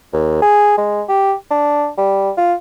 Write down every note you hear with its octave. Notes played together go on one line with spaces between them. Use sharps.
D#2
G#4
G#3
G4
D4
G3
F4